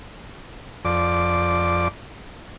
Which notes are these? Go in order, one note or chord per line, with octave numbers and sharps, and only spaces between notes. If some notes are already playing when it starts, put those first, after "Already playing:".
F2 D5